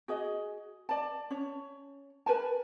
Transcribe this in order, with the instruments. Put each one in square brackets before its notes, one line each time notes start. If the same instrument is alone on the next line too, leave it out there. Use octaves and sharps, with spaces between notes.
[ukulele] F#4 G#4 D#5
D5 A5
C#4 C#5
A#4 B4 G#5 A5